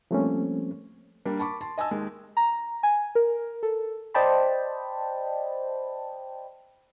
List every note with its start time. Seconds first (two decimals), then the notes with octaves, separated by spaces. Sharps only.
0.11 F3 G3 A3 A#3 C4 C#4
1.25 G3 A#3 D4
1.39 A5 B5 C#6 D6
1.61 A5 C6
1.78 D#5 G#5 A5 E6
1.91 D#2 G#3
2.37 A#5
2.83 G#5
3.15 A#4
3.63 A4
4.14 C5 D5 D#5 G5 A5 B5